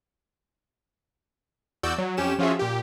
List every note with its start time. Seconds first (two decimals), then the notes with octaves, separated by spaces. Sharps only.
1.83 E2 F#4 D5 E6 G6
1.98 F#3
2.17 F2 C#4 G4 E7
2.39 F3 C#4 F4 F#4 G#4 E5
2.59 A#2 G4